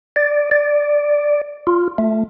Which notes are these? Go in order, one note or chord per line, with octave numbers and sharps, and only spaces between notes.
D5
D5
F4
A3